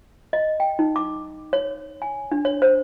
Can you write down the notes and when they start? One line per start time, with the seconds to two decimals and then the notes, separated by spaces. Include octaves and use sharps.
0.33 D#5
0.60 G5
0.79 D#4
0.96 D6
1.53 C#5
2.02 G#5
2.32 D4
2.45 C#5
2.62 C5